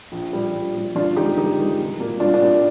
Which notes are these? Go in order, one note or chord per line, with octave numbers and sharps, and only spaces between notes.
A#1
A#2 G3
A#1
A#2 G3
G1 D4 F4
F2 D#3 G#3 D#4 G4
G1 D#4 G4
F2 D#3 G#3
C2
A#2 G3 A#3
C2 D4 F4
D4
A#2 G3 A#3